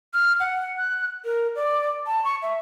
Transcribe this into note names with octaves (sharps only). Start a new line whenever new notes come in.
F6
F#5
F#6
A#4
D5
A5
C#6
E5